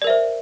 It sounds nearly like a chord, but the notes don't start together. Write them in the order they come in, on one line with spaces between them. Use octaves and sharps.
D5 A#4 E5 C5